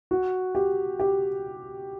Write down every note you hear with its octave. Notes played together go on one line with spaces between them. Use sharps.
F#4
G4
G4